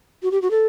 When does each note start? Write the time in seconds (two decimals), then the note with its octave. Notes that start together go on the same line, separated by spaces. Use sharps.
0.23 F#4
0.31 G4
0.42 F#4
0.51 A4